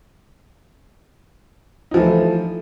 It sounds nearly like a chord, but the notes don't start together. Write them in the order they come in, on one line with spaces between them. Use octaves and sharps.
D#4 F3 E3 A3